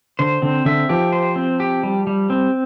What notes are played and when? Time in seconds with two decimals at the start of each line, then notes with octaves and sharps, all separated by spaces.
0.19 D3 C5
0.42 D3 C4
0.65 D3 E5
0.89 F3 G4
1.12 C5
1.36 C4
1.60 G4
1.83 G3
2.07 G3
2.30 C4